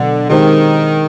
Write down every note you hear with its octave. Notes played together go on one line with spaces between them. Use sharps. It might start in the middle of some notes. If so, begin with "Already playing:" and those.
Already playing: B2 D3 F#3 B3 D4
D#3 G#3 C4 D#4 G4